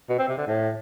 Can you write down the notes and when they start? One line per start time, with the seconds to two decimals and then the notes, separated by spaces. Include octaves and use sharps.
0.09 B2
0.19 C4
0.28 C3
0.38 D3
0.47 A2